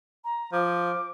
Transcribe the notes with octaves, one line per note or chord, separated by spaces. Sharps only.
A#5
F3 D6